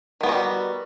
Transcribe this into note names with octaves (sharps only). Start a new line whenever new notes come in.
D#3 G3 G#3 B3 F#4